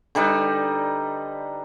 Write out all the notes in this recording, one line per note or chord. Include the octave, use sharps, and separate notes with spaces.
D3 G3 D#4 B4